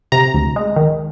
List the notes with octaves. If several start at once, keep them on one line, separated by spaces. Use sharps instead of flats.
C3 A#5
D2
G#3
D#3